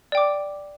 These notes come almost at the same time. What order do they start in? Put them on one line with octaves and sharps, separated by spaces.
D5 G5 D6